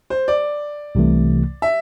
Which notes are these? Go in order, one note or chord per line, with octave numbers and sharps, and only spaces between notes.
C5
D5
C2 C3 E3 A3
E5